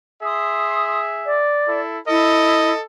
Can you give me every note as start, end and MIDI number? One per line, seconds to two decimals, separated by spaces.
0.23 1.48 68
0.23 1.48 76
0.23 0.99 84
0.23 0.99 87
1.24 1.77 74
1.68 2.00 64
1.68 2.00 69
2.08 2.70 64
2.08 2.82 69
2.08 2.82 75